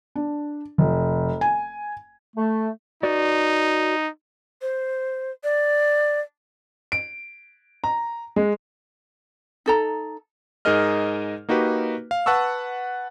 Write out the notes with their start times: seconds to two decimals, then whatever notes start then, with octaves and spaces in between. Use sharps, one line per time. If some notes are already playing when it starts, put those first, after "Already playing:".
0.16 D4
0.78 F1
1.41 G#5
2.37 A3
3.03 D#4 F#4 B4 D5
4.62 C5
5.44 D5
6.92 D7
7.84 A#5
8.36 G#3
9.66 D#4 A4 A#5
10.65 G#2 D#4 G#4 A#4 D#5 F6
11.49 A#3 D#4 F#4 G4 B4
12.11 F5
12.26 B4 F#5 A5 C#6 E6